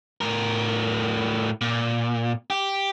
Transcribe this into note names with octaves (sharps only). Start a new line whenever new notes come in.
A2 A#4
A#2
G4